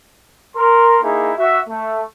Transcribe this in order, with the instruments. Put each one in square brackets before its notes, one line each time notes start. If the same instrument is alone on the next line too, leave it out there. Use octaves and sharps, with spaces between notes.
[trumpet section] A#4 C6
A#3 D#4 E4 G#4
F#4 E5
A3